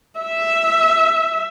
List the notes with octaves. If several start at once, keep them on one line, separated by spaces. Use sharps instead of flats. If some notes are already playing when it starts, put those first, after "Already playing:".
E5